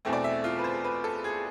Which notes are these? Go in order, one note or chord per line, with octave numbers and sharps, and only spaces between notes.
E2 B2 A3 C4
D5
E5
F4
B4
C5
B4
A4
G#4